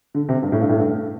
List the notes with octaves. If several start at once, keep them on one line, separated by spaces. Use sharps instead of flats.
D3
C3
G2
A2
G2
A2
G2